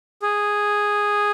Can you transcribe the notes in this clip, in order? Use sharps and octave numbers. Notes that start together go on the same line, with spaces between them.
G#4